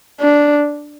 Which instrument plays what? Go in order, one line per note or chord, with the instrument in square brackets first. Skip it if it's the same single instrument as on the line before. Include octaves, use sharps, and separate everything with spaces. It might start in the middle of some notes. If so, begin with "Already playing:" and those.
[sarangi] D4